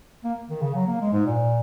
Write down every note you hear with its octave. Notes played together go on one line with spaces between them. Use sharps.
A#3
D#3
C#3
F#3
A#3
G#3
G#2
A#2